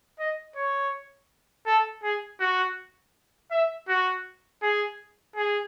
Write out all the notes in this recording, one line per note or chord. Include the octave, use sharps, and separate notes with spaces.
D#5
C#5
A4
G#4
F#4
E5
F#4
G#4
G#4